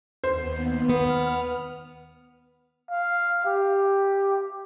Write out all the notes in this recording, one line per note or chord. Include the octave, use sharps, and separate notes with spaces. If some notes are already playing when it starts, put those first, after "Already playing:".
D#2 B3 C5
B3 F6
F5
G4